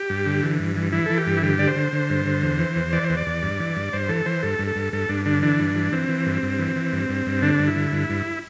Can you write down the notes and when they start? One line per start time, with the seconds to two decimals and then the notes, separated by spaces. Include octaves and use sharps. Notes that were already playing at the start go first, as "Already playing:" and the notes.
Already playing: G4
0.10 G2
0.26 D3
0.43 E3
0.59 G2
0.76 E3
0.92 E3 E4
1.06 E3 A4
1.18 G4
1.27 G2
1.37 E4
1.42 D3 G4
1.59 D3 D5
1.68 C5
1.76 D3
1.93 D3
2.10 G2
2.26 D3
2.42 E2
2.59 E3
2.76 E2
2.93 E3 D5
3.04 C5
3.10 E2
3.17 D5
3.27 E2
3.43 G2
3.60 E3
3.77 G2
3.93 G2 C5
4.09 E3 A4
4.26 E3 C5
4.43 G2 A4
4.59 G2
4.67 A4
4.76 G2
4.93 G2 A4
5.09 G2 D4
5.26 D3 D4
5.42 E3 D4
5.60 G2
5.75 E3
5.92 E3 C4
6.09 E3
6.27 G2
6.43 G2
6.59 E3
6.76 E3
6.93 G2
7.09 G2
7.26 G2
7.42 D3 D4
7.59 G2
7.68 E4
7.76 D3
7.92 G2
8.10 G2